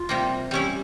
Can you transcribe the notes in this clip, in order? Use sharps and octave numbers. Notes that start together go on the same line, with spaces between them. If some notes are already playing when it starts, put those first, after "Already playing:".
Already playing: F4
C3 G3 A#3
G3 C#4 E4 G4